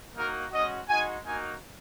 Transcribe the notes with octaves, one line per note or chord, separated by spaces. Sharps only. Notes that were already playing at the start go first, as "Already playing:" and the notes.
A#3 D#4 F#4 A#4
G#3 C#4 F#4 D#5
G#3 D#4 F#4 G#5
A#3 D#4 F#4 G#5